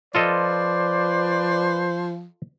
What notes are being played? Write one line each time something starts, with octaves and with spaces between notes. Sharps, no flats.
F3 F4 A4 B4 C5 D5 D#5